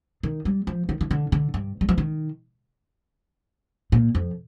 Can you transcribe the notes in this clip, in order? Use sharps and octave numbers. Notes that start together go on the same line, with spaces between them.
D#3
G3
F3
D#3
D#3
D3
D3
G2
G3
F3
D#3
A#2
F2